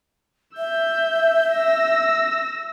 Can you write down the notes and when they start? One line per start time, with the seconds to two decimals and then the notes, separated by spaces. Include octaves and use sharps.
0.57 E5 E6 G6
1.50 E6 A#6